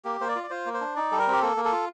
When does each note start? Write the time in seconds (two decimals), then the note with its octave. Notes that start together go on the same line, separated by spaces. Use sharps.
0.05 A#3 G4
0.21 A#3 C5
0.29 D5
0.35 F4
0.44 D5
0.50 F4 C5
0.66 A#3
0.74 C5
0.81 D4
0.96 D#4 D5
1.12 G3 A4
1.19 A#4
1.27 C4 G4
1.42 A#3 A4
1.57 A#3
1.65 A4
1.72 F4